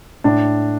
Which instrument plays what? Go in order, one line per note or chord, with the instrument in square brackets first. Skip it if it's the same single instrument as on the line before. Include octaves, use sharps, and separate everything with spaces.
[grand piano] A2 D4